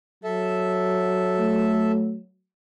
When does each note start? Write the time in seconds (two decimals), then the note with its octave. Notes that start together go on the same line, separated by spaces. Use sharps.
0.24 F#3 A4 E5
1.39 A3